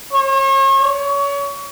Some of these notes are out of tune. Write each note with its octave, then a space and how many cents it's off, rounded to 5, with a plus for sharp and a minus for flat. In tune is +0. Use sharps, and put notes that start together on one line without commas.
C#5 -40
C#5 +30